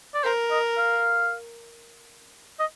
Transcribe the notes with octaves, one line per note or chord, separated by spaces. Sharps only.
D5
A#4 C5
D#5
F5
D#5